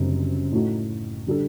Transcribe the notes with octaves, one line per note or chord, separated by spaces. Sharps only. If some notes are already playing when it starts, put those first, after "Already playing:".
Already playing: F#1 F#2 D3 G3 C4
A2 A3 D#4 F#4
D3 G3 D4 A4